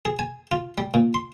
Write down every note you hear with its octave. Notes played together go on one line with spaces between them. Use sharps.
G#4
G#5
F4
G3
A#2
C6